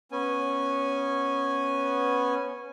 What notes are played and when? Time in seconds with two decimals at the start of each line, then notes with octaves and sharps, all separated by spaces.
0.12 B3 C#4 G#5